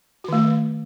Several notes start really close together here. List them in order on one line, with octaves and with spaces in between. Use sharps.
F#4 D#3 A3